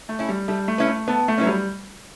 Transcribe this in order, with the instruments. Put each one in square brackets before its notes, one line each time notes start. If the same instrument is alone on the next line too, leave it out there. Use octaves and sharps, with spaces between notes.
[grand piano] A3
[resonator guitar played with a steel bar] C#4 E4
[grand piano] G3
[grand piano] G3 [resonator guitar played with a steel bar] A3
[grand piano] A3
[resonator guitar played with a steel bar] C#4 E4 B4
[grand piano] A3
[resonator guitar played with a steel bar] A3 [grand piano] B3
[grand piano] A3
[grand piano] F#3 [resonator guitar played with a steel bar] C#4 E4 B4
[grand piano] G3